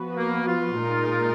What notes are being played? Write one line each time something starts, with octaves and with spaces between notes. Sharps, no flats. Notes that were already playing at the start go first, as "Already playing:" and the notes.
Already playing: F3 B3 F#4 B4
A#3
F4
A#2 G#3 D#4 A#4